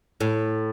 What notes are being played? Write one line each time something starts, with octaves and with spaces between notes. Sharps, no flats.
A2